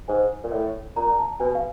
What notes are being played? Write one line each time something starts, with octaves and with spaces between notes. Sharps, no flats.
G#2 G#5
A#2
A2
A#2 A#5
A#5
A5
B2 G#5
F5